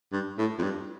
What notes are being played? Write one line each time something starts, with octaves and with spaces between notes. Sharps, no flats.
G2
A2
F2
G2